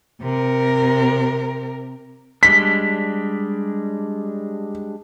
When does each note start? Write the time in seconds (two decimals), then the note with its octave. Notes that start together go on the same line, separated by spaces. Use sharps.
0.21 C3 A#4
2.43 G3 G#3 D4 B6